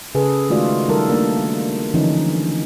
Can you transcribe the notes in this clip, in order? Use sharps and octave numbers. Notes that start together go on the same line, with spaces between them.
C#3 G#4 A4 B4
D#3 G#3 A3 F4 F#4 D5
D#3 G3 A4 A#4
A3 A#3 D4
D3 E3 F3 C#4 D#4